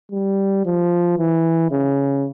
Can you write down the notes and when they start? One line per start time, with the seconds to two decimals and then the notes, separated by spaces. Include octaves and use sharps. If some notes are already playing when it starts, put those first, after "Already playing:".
0.12 G3
0.66 F3
1.18 E3
1.71 C#3